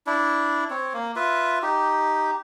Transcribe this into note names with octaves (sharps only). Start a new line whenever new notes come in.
D4 E4
C4 C#5
A#3
F4 B4 E5
D#4 G4